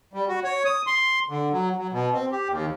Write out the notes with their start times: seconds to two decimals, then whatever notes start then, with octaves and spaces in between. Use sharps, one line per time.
0.13 G3
0.29 F#4
0.44 C#5
0.65 D#6
0.87 C6
1.29 D3
1.53 F#3
1.78 F#3
1.93 B2
2.13 C4
2.32 G4
2.49 D#2